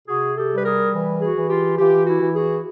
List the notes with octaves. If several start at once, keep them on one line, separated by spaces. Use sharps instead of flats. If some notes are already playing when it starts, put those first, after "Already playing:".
C3 F#4 G#4
G4 A4
G3
B4
G#4 A#4
E3
F#4 G#4
E3
F4 G4
E3 F4 G4
E4 F#4
E3
F#4 G#4